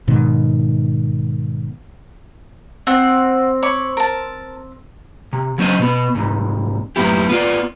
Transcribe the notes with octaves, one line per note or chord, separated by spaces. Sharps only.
G#2 B2 D#3
C4 F#5
C#5 B5 D6
A#4 A5
C3
C#3 F#3 C#4 C5 C#5 D#5
B2 B3
C2 G#2
F#2 A2 F#3 B3 E4 G4
B3 F4 D5